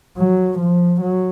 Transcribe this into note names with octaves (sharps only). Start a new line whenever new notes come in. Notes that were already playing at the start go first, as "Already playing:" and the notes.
F#3
F3
F#3